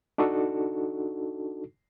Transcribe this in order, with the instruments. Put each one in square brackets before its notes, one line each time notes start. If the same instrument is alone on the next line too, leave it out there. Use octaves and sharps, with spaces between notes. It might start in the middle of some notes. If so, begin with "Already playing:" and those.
[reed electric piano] D4 D#4 F#4 A4